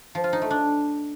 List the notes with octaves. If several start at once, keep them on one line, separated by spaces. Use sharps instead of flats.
F3
F4
D#4
A3
D4